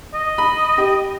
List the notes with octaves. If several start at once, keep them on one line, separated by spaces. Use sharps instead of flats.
D#5
B5
G4